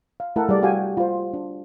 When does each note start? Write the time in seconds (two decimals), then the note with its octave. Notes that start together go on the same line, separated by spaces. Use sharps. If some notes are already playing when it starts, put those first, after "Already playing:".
0.20 F5
0.36 A3 E4 A4 A#4 F#5
0.49 G3 G#4 D5
0.62 F#4 G4 F5 G5 G#5
0.97 F4 C5
1.33 D4